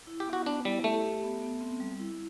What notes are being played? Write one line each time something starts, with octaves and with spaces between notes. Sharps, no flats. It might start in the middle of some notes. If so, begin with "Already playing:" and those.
E4
G4
B3
F#4
B3 D4
G3 E4
A3 G4
G4
B3
B3
C4
G3
E4